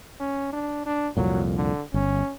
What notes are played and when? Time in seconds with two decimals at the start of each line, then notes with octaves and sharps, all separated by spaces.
0.20 C#4
0.53 D4
0.86 D4
1.17 C2 F2 A#2 F#3
1.57 D3
1.94 G1 C#4